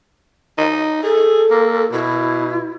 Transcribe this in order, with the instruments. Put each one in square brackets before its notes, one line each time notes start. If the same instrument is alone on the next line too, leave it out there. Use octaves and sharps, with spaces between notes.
[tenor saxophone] D#4
[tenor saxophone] G#4 [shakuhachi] A4
[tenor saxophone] A#3
[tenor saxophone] B2 [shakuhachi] E4